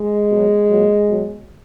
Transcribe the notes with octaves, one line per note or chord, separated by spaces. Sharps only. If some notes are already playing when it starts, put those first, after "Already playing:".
Already playing: G#3
B2 F#3
A#2 F#3
B2 F#3